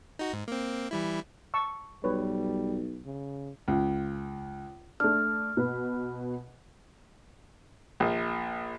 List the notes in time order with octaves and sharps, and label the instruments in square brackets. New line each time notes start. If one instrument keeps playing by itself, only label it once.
[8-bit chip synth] D#4 F#4
G#2
A#3 C4
E3 G3 E4
[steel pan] A5 C#6 E6
[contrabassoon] B1 [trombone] G3 [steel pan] B4 C#5
[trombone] C#3
[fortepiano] C#2
[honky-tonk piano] A3 D4 [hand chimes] F6
[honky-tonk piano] B2 B4
[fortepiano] A#1